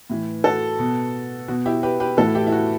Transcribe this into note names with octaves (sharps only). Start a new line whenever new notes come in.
A2 E3
F#4 A4
B2
B2 F#4
E4 G4
G4 B4
G4 B4
A2 E3 F#4 A4
E4 G4
E4
F#4